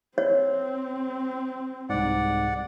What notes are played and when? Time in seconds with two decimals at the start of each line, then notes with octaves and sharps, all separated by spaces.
0.18 C4 C#5
1.90 C2 G#2 D5 F#5